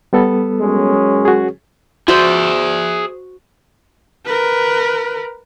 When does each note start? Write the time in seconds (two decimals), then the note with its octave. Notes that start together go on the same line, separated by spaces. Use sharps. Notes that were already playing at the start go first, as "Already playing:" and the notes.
0.13 G3 B3 A4
0.61 F#2 G#3 C#4
1.25 F#4 G#4
2.08 F#4 G#4 C5 D5 E5
4.26 A#4 B4